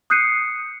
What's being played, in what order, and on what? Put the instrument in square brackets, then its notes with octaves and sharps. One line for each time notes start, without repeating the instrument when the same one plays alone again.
[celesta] D#6 F#6 G6 C7 C#7 D#7